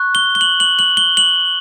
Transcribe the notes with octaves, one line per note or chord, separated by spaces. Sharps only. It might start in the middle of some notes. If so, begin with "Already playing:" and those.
Already playing: C#6 F#6
G7
G7
F#7
F#7
F#7
G7
F#7